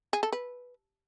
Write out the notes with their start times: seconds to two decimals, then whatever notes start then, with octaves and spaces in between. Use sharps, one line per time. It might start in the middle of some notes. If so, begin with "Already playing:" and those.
0.13 G#4
0.23 A4
0.32 B4